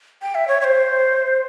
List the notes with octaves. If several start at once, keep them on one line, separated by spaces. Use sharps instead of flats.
G5
E5
C#5
C#5
C5